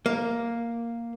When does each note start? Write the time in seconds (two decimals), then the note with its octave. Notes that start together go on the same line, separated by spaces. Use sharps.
0.06 A#3